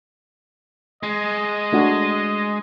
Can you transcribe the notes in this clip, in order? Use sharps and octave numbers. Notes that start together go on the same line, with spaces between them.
G#3 D#5
A3 D4 F#4